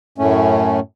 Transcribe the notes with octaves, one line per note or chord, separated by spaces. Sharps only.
F#2 A2 A3 C#4